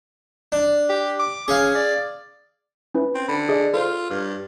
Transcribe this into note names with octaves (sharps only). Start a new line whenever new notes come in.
D4
G4
D6
C#4 G#4 F5
D5
C#4 E4 B4
C4
D3 B5
G#4 D5 D#5
F4 A4 A#4 C5
G2 F6